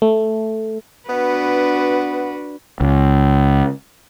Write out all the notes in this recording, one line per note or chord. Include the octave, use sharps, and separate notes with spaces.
A3
B3 D4 F#4 B4
C#2